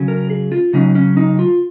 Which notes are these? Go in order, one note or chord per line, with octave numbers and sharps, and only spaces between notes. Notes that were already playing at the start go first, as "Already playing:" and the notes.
Already playing: C#3 F#3 C#4
A#4
G#4
F4
C#3 F#3 C#4 D#4
C#4
D#4
F4